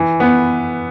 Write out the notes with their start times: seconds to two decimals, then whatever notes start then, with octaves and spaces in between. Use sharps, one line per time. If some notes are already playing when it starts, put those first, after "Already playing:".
Already playing: E3
0.20 B3